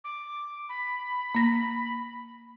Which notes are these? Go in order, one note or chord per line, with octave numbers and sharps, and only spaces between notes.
D6
B5
A#3 A#6